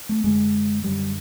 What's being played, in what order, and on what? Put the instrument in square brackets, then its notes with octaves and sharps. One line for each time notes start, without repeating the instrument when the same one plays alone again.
[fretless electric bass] A3
F#2 D3 G#3
F#2 D3 G3